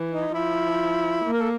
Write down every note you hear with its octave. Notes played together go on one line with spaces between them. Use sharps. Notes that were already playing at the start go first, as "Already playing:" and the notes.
Already playing: E3
D#4
F3 E4
A#3
A#4
A4